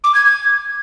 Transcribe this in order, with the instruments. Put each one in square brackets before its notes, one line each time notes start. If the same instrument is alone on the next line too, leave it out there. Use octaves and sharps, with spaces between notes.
[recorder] D6
G#6
G#6